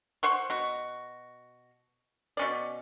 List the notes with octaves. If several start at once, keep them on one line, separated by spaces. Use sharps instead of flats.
C5 F#5 C#6
B2 F#4
B2 C#4 D5